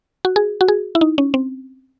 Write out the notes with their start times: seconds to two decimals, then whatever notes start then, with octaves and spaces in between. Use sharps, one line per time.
0.25 F#4
0.36 G#4
0.61 F#4
0.68 G#4
0.95 E4
1.01 D#4
1.18 C#4
1.34 C4